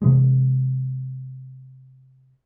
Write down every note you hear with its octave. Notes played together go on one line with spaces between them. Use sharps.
C3 E3 G#3